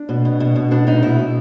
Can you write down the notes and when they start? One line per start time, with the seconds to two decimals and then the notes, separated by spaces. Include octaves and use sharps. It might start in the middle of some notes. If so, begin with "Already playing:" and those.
Already playing: D4
0.09 B2
0.25 B2
0.40 B2
0.56 B2
0.71 B2 D4
0.87 B2 D#4
1.03 B2 E4
1.19 B2